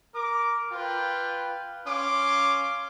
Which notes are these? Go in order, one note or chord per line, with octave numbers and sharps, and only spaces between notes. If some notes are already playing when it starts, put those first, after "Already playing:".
A#4 D6
F4 B4 G5
C#4 F5 C6 D6